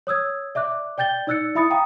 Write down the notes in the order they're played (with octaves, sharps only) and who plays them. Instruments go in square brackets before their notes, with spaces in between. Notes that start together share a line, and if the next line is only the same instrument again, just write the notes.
[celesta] C#5 D#6 E6 G#6
D5 E5 D6 F#6
D5 G5 G6 A6 G7
D#4 D5 E6 F#6 A6 C#7
E4 E5 B5 D#6 A6 C#7
F5 G5 A#5 D#6